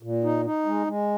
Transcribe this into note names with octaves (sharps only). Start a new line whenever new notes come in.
A#2
D#4
D#4
G#3
G#3